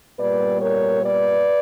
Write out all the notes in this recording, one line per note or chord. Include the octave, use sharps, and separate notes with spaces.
A#2 G3 B3 B4 D5
A#4 C#5
B4 D5